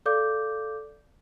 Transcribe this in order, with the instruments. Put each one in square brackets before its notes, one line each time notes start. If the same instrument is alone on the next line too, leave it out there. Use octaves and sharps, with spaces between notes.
[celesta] A4 D5 F5 D6 G6